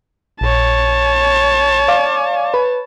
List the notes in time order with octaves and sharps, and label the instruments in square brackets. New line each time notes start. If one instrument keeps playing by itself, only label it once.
[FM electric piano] A#1 [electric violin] C#5 A5
[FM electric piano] D5 F5 D6
B4